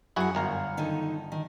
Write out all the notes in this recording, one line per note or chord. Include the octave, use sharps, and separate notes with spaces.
F#2 E4 F#4 G#4 F#5
G1 A#4 F5
D3 D#3 D#4
D#3